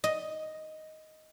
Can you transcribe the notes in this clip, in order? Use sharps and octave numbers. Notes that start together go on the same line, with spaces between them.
D#5